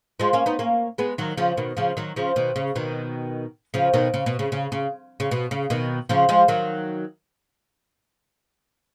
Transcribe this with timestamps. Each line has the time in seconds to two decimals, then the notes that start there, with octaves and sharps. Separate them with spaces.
0.20 F3 G#3
0.33 A#3 C#4
0.46 B3 D#4
0.59 A#3 C#4
0.98 G#3 B3
1.18 D#3 F#3
1.37 C#3 F3
1.57 B2 D#3
1.77 C#3 F3
1.97 D#3 F#3
2.16 C#3 F3
2.36 B2 D#3
2.56 C#3
2.76 B2 D#3
3.74 C#3 F3
3.93 B2 D#3
4.14 C#3
4.26 B2
4.39 C#3
4.52 C#3
4.72 C#3
5.20 C#3
5.31 B2
5.51 C#3
5.70 B2 D#3
6.09 C#3 F3
6.29 F3 G#3
6.48 D#3 F#3